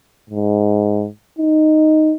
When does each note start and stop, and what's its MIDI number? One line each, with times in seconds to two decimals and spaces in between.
0.30 1.07 44
1.39 2.14 63